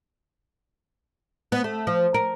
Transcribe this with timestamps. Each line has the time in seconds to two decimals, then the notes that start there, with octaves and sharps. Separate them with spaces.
1.52 B3
1.64 A3
1.87 F3
2.14 A#4